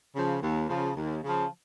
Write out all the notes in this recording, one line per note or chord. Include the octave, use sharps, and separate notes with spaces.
C#3 F3
D#2
C#3 F3
D#2
C#3 F3